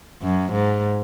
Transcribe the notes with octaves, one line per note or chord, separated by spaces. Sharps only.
F#2
G#2